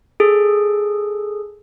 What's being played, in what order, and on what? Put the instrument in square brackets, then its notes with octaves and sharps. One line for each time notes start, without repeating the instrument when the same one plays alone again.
[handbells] G#4 A4